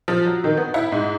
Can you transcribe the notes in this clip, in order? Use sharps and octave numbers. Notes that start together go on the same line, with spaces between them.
F3
F#3
D#3
B3
E4
G#2